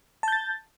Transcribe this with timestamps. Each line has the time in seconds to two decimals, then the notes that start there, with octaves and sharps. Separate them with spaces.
0.23 A5
0.28 G6
0.32 A6